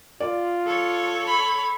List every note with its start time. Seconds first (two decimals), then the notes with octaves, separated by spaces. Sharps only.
0.20 F4 D5
0.67 A4 C#5
1.27 B5